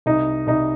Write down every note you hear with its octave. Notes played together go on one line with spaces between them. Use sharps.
C2 D#4
C2 D#4